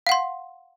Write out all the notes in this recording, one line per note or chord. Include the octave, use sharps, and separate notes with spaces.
F5 F#5 C6